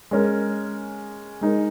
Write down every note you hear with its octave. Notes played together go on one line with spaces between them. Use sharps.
G#3 C#4 A#4
G#3 D#4 A#4